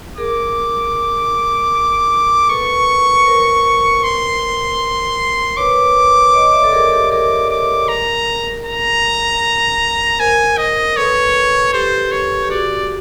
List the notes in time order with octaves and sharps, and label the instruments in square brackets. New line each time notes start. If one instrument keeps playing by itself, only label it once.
[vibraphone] G#4 A#4 [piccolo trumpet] D6
[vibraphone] A4 B4 [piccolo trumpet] C#6
[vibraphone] A#4 C5
[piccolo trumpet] C6
[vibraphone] B4 C#5 [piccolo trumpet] D6
[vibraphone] C#5 D#5
D5 E5
A4
G#4 A#4
G4 A4
[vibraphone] G#4 A#4 [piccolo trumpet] D6
[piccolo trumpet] D6
A#5
A#5
[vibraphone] A#4 C5 [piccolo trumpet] G#5
[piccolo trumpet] D#5
[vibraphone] A4 B4 [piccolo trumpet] C#5
[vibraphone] G4 A4 [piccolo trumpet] C5
[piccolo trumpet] C#5
[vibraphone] G4
[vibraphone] F#4 G#4 [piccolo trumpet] D5